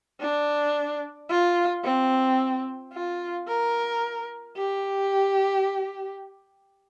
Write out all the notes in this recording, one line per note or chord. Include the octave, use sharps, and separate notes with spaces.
D4
F4
C4
F4
A#4
G4